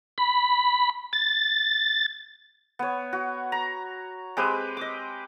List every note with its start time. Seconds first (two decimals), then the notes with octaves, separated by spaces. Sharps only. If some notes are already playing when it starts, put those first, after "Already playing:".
0.18 B5
1.13 A6
2.79 B3 C#5
3.13 F#4
3.52 A#5
4.37 G#3 C4 G4 B4
4.77 D#5 D6